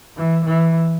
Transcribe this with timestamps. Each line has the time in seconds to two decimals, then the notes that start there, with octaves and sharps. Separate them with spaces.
0.17 E3
0.45 E3